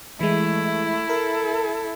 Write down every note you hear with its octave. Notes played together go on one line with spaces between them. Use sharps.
E3 G#3 A3 E4
A4 A#4